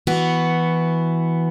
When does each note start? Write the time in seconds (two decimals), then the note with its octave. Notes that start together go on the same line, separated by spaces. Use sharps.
0.07 E3 B3 F#4